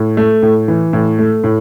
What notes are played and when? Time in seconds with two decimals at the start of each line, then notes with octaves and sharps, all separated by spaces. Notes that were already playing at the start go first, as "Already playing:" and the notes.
Already playing: A2
0.17 A3
0.42 A2
0.68 E3
0.93 A2
1.19 A3
1.44 A2